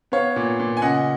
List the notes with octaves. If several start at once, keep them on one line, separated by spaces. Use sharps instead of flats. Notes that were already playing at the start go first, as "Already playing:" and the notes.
B3 C#5 F5
A#2
A#2
G#5
C#3 D#5 F#5